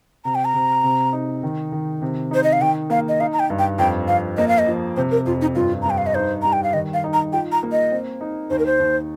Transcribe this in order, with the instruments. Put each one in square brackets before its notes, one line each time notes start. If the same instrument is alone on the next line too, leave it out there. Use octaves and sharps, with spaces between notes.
[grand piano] C3 [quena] A#5
[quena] G5
A#5
[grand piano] C3
C3
D#4
D#3
D#3
C3
[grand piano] D#4 [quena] C5
[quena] D#5
F5
[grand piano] D#3 [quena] G5
[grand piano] A#3 [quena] F5
[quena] D#5
[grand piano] D#4 [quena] F5
[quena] A#5
G5
[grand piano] G2
[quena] G5
[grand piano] F2 [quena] G5
[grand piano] F2 [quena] F5
[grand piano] A#3 [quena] D#5
[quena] F5
D#5
[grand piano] F3
[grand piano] C3 [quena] C5
[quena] A#4
[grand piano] F2 [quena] F4
[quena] D#4
[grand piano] G2 [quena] F4
[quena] A#5
[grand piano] G2 [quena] G5
[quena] F5
D#5
[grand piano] D#4 [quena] C5
[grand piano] G3 [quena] A#5
[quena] G5
F5
[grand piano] D#3 [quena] D#5
[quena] F5
[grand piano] D#4
[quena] A#5
[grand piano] F4 [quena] G5
[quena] A#5
[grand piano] A#3
[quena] D#5
[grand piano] C4
D#4
[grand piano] D#2 [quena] C5
[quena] A#4
C5
[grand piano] D#2